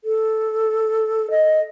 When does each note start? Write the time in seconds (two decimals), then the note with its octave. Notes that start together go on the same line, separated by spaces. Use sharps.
0.04 A4
1.30 D#5